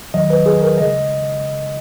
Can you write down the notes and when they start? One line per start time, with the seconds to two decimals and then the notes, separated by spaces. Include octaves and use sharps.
0.14 E2 D#3 F#3 D#5
0.30 B4
0.46 G#4
0.62 A#4
0.78 C#3 G#3 D#5